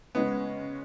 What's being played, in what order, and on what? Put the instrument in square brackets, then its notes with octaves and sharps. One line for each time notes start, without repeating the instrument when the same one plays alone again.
[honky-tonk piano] C#3 G#3 C#4 [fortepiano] B3